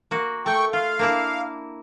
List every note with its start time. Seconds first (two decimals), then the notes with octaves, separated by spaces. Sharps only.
0.11 A#3 F#4
0.46 A3 G5 C#6
0.73 F4 F5
0.99 A#3 D4 E4